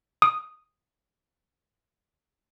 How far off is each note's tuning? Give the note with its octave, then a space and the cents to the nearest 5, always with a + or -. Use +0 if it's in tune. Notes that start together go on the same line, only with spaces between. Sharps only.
D#6 -5